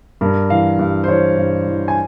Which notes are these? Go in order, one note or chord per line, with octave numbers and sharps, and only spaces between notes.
G2 A#4
E3 F5
G2
C5
E3 C#5
G2
E3
G#5